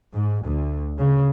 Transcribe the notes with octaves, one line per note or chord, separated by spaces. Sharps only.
G#2
D2
C#3